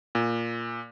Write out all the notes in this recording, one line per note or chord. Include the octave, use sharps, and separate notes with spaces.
A#2